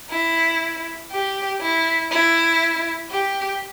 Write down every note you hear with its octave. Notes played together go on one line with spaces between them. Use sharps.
E4
G4
E4
E4
G4